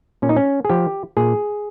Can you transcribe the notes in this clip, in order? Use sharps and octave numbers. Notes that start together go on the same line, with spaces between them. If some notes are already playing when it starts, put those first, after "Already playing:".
A#2 C#4
D#4
C#4
G#4
F3 G4
A#2 G#4